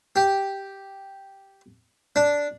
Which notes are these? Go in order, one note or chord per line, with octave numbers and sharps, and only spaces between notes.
G4
D4